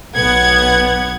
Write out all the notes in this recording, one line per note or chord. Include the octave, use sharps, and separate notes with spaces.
B1 B3 F#5 G#6